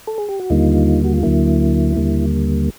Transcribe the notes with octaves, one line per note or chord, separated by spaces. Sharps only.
A4
G#4
G4
F#4
D#2 D3 G3 A#3 D#4 F4
F#4
F4
D2 D3 F#3 A#3 E4
D#2 D3 G3 A#3